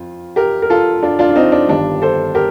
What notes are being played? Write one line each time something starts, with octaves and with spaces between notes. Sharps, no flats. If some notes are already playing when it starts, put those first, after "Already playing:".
Already playing: F2 F4
G4 A#4
A#4
F4 A4
D4 F4
D4 F4
F4
C4 D#4
D4
G1 G2 D#3 G3 D4
A4 C5
G4 A#4